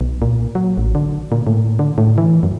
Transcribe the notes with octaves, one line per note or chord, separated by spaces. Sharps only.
B1
A#2
F#3
A1
D3
A#2
A2
D3
A2
E3
F#2